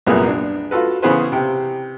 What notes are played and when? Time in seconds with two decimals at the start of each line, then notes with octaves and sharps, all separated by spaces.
0.07 C2 F#2 A#2 A#3 B3 G#4
0.28 D4
0.71 F4 F#4 A4 B4
1.02 C#3 E3 B3 G#4 B4 C5
1.32 C3 G5